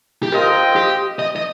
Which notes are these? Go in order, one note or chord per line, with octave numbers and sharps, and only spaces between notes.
G4
C4 F4 A#4 D#5 G5
G4
D#5
D#5